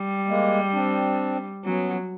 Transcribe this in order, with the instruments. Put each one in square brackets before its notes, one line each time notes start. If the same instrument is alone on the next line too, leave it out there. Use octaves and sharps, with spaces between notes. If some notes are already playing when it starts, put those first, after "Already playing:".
Already playing: [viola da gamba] G3
[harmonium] G#3 A#3
C4 D4
[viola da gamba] F#3 [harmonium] B3 C#4